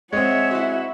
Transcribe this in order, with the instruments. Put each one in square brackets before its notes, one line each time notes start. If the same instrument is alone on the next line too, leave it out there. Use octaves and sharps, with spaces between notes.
[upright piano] G#3 C4 [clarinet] C#5 [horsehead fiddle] E5 F#5
[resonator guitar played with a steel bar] E4 C5 [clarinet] F#4